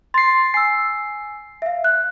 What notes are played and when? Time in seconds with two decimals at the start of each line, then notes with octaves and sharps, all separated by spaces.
0.14 C6 A6 C7
0.54 G#5 E6 C7
1.62 E5 F5
1.84 F#6